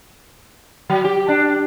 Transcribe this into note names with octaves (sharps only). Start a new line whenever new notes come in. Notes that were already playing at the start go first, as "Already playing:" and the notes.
F#3
G4
D4